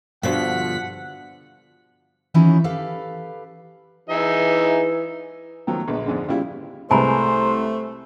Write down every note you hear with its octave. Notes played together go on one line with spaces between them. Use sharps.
G2 B2 D3 F3 F#5 B6
D#3 E3 F#3 C#4 D#4 E4
G4 A4 B4 F5
E3 D#4 G#4 E5
D#3 F3 F#3 A3 B3
A#1 D3 G#3 B3
F2 G#2 D3
C#3 G3 E4 F4
C2 G#3 A3 B4 C5 G#5 A#5 B5